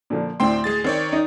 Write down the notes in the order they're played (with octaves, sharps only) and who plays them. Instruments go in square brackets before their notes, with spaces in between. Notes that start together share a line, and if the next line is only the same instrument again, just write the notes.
[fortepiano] A#2 D3 F3
[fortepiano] D2 A2 D4 [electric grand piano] C4 G5 C6
[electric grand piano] G#3 G#4 A6
[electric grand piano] D#3 C#5 D5 [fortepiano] C4
[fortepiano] D#4